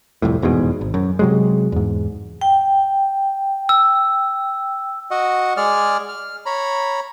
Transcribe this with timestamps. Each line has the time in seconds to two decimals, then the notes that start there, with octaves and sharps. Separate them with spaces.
0.22 C2 F2 A2
0.42 F1 E2 G#2 B2
0.81 G#1
0.94 F#2
1.19 C3 F#3 G#3
1.72 E2 G#2
2.41 G5
3.69 E6
5.11 F#4 D#5 F#5
5.57 G#3 G#4 D5 F6
6.09 F6
6.46 C#5 A#5 B5